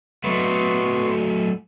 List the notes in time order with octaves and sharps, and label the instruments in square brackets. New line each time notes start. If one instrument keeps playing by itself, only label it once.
[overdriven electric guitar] F#3 A3 [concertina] B3 C6 C#6